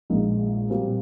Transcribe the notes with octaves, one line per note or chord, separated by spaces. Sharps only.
A#1 A#2 G#3 D#4
A#2 G3 C4